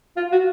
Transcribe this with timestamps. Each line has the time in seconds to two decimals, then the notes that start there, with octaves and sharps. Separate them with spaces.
0.17 F4
0.32 F#4